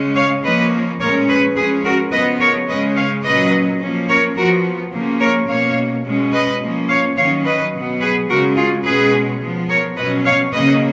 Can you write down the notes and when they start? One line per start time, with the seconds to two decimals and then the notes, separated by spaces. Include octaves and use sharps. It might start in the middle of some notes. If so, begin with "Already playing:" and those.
Already playing: C#3 G#3 C#4
0.16 C#5 F5
0.43 F3 A#3 C#4 B4 D#5
1.00 A#2 G#3 C#4 A#4 C#5
1.28 G#4 B4
1.56 F3 G#3 C#4 G#4 B4
1.84 F#4 A#4
2.12 C#3 F3 B3 B4 D#5
2.40 A#4 C#5
2.68 C#3 G#3 C#4 B4 D#5
2.96 C#5 F5
3.25 A#2 F#3 C#4 B4 D#5
3.80 F3 A#3 C#4
4.09 A#4 C#5
4.36 F3 F#4 A#4
4.40 B3
4.93 C#3 F3 A#3 C#4
5.20 A#4 C#5
5.48 B2 A#3 C#4 C#5 F5
6.05 B2 G#3 C#4
6.33 B4 D#5
6.61 F3 A#3 C#4
6.89 C#5 F5
7.17 D#3 F#3 C#4 C#5 F5
7.44 B4 D#5
7.73 B2 F#3 B3
8.01 G#4 B4
8.29 C#3 G#3 C#4 F#4 A#4
8.56 F4 G#4
8.85 B2 G#3 C#4 G#4 B4
9.40 F3 B3
9.69 A#4 C#5
9.97 B2 F#3 C#4 B4 D#5
10.25 C#5 F5
10.53 C#3 F#3 A#3 C#4 B4 D#5